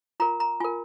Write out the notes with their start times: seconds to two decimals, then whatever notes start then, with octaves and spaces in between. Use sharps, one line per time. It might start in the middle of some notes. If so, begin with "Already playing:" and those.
0.20 F4 A#4 A#5
0.40 A#5
0.60 F4 A#4 G#5